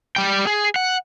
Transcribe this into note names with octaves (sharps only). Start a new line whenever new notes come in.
G3 G5
G#4
F#5